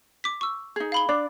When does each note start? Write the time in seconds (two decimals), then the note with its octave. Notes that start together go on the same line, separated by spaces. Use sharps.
0.24 D6 B6
0.41 C#6 E6
0.76 D#4 G#4
0.92 F5 B5 G7
1.09 D4 D5